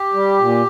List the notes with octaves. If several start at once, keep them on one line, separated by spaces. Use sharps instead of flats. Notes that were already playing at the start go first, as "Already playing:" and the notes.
Already playing: G4
G3
A#2